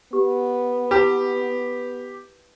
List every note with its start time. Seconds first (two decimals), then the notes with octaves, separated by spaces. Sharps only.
0.13 B3 G4
0.91 E4 G4 B4